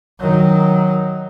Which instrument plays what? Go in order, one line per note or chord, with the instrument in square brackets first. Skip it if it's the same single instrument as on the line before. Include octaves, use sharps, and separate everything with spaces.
[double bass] D#3 F#3